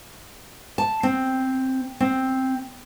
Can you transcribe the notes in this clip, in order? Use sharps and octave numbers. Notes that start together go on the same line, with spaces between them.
A5
C4
C4